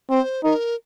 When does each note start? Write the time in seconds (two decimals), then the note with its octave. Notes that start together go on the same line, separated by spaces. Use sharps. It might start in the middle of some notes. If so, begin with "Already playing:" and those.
0.10 C4 C5
0.44 D#4 A#4